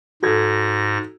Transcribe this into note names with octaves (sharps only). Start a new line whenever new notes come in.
G#2 F#4 A4 G#6 A#6